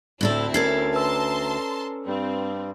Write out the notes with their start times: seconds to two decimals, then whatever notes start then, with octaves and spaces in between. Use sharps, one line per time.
0.21 D2 A2 C4 D4 E4 A4
0.54 C#4 A4 A#4 D5 G#6 C7
0.94 B4 A5 A#5 C6 E6
2.07 G2 G3 C4